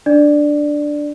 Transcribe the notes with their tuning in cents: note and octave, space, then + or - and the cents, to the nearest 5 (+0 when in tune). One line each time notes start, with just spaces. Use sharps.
D4 +0 D5 +10